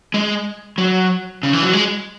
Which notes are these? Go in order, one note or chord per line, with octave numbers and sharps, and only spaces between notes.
G#3
F#3
C#3
E3
F#3
G#3